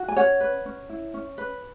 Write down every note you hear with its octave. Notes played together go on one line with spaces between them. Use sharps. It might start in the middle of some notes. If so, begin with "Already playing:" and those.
Already playing: F#4
G#5
C#4 C#5 F#5
B4
C#4
E4
C#4
B4